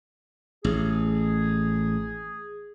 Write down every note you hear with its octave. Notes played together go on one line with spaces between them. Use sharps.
A1 G#4